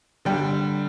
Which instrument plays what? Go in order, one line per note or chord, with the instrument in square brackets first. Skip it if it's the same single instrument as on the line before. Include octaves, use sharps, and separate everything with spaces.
[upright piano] D3 G3 G5